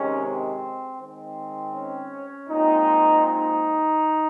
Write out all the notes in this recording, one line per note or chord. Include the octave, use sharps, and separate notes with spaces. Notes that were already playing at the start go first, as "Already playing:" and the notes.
Already playing: C3 D#3 G#3 C#4
C4
D#3 G#3 C4
C#4
A#2 G#3 C4 D#4
D#4